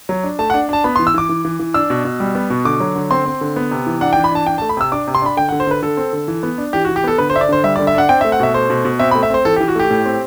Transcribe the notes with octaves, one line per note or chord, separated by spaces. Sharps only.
F#3
D4
A3 A5
F#5
D4
D4 A5
B3 B5
C6
E3
E6
E3 D6
E3
E3
E3
D4 E6
B2
B2
G3
B3
B2
D3 D6
F#3
D3
C4 C6
C4
D3
B3
C3
E3
D4 F#5
G5
E3
B5
D4 A5
D4 G5
A5
A3
B5
C3 E6
D4 D6
C3
C6
D4 B5
D3 G5
F#5
D3
C5
D3 B4
D3 A4
C4
D3
E3
B3
D4
E3 G4
F#4
E3
G4
B3 A4
D3 B4
C5
D4 E5
D5
D3 C5
G3 E5
D5
D3
E5
D4 F#5
C4 G5
E5
A3
F#5
B2 E5
A3 C5
B2
B2
C4 E5
B5
A3
E5
C4 C5
E3 A4
G4
E3
F#4
A3 G4
A2
C4